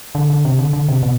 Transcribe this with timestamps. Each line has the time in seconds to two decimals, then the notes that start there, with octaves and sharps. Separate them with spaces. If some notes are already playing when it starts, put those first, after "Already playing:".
0.15 D3
0.30 D3
0.45 C3
0.59 D3
0.73 D3
0.88 C3
1.03 B2